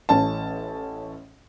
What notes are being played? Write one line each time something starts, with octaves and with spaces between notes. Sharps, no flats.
A1 A2 C#4 A5